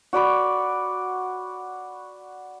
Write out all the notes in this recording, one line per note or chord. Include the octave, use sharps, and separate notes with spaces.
F#4 D5 B5 D6